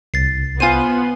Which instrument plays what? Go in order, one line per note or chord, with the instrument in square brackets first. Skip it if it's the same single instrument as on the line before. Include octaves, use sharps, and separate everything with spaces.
[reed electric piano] C2 [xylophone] A6 C7
[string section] B3 [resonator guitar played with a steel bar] F4 C5 [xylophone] G#5 D#7